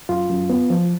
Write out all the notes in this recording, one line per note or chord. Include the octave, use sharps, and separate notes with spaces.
F#2 F4
F#2
B3
F3